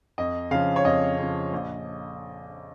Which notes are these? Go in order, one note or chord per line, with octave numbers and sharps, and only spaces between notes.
F2 D#5
C#3 F3 F5
C#5
F2 D#5
C#3 F3
A#1